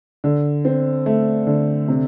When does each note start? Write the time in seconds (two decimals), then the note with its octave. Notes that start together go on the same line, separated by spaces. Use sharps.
0.24 D3
0.65 C4
1.06 A3
1.47 D3
1.88 C3